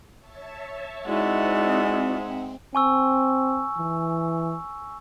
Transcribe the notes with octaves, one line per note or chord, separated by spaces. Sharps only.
C#5 E5 A5
G#3 C4 D#4 E4 F#4 D5 E5 F#5
C4 G#5 C#6 E6
E3